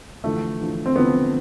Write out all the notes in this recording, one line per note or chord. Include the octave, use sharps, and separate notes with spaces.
E2 D3 F3 A3
E2 D3 F3
C4
E2 D3 F3 B3